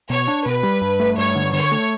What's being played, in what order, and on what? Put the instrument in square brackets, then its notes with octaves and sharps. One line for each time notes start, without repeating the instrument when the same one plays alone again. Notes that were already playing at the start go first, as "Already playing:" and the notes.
[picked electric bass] B2 [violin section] C#5
[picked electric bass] D4
[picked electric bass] B2 [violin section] B4
[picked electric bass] G3
G2
A3
[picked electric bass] G2 [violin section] C#5
[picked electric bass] D3
[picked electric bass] D3 [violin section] C#5
[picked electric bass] A3